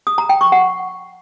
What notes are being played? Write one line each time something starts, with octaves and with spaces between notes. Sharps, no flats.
D#6
A#5
G5
C#6
F#5